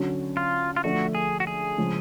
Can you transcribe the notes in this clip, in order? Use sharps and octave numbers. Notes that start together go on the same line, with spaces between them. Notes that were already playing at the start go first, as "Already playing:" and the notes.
Already playing: D3 F#3 C#4
F4
F4
D3 F3 A3 D4 F#4
G#4
F#4
G#4
C#3 F3 G#3 C#4